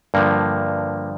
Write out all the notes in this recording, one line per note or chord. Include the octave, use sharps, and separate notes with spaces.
G2 D3 F3 A#3